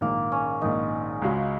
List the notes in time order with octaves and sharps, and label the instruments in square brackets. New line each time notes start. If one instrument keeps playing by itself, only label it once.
[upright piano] A#1 G#2 D#3 [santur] A#3
[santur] C#4
[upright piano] A#1 G#2 D#3 [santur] D#4
[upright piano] C#2 C#3 G#3 F#4